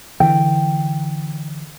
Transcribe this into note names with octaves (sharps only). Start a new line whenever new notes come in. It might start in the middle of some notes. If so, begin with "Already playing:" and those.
D3 E3 G5